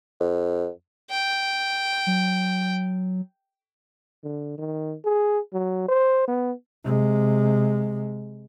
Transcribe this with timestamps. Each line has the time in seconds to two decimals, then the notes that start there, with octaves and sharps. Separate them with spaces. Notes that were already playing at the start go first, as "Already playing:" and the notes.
0.20 F2
1.10 G5
2.07 F#3
4.24 D3
4.58 D#3
5.05 G#4
5.53 F#3
5.88 C5
6.28 B3
6.85 C3 G#3